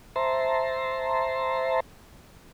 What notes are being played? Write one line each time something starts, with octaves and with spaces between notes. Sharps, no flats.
C5 E5 A5 A#5 C6